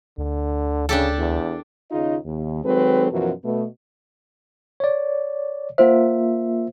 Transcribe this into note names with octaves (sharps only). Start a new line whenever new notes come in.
D2 D3
C#3 D4 G4 A4
E2
D#2 C#3 D#4 F4 G#4 D#5
D#2
D#3 F#3 G#3 C4 A4 B4
F#2 B2 E3 F3 F#4 A#4
B2 A3 B3
C#5 D5
A#3 F4 C5 E5 F#5